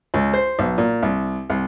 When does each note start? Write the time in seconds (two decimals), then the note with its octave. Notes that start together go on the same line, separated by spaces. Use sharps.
0.14 C#2
0.34 C5
0.59 B1
0.78 A#2
1.03 C2
1.50 C2